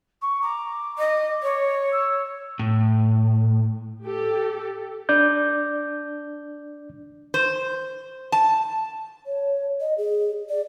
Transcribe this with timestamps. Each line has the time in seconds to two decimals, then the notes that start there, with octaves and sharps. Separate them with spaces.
0.21 C#6
0.42 A#5 D6
0.98 D#5
1.43 C#5
1.92 E6
2.59 A2
4.03 G4 A4
5.09 D4 D5 G6
7.34 C5
8.32 A5
9.26 C#5
9.81 D#5
9.98 G#4
10.49 D5